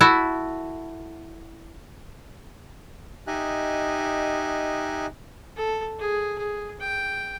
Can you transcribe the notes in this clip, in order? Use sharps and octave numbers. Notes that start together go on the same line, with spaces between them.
E4 F#4 A4 E5
D#4 G4 D#5 E5 G#5 F#6
A4
G#4
G#4
G5